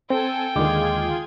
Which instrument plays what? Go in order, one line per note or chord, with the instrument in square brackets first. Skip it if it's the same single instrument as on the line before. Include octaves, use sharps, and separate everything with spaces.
[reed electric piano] C4 [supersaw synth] A4 G#5 [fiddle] G5
[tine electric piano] D#2 G#3 D6 [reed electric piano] D3 D#3 [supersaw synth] F4 G#4 G#6